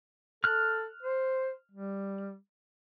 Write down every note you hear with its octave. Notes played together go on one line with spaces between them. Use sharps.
A4 F6 F#6
C5
G3